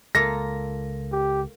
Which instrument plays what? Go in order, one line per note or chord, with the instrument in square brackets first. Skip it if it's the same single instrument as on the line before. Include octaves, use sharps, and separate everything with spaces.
[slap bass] C#2 [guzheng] A#3 F4 A4 [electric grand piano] A#6
[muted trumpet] G4